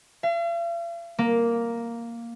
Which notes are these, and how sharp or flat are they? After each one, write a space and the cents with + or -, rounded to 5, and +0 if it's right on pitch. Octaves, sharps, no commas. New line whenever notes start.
F5 -45
A#3 +0